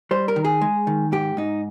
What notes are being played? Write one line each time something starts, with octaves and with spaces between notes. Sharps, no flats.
G3 C5
A#4
D#3
G#4
G#3
D#3
G#2 G4
G#2 D#4